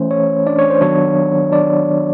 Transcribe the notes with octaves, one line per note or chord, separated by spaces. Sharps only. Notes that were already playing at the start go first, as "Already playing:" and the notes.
Already playing: E3 A3 C#4 C5
C#5
D4 D5
C#5
C5
D#3 F#3 B3 D4 C#5
D4 D5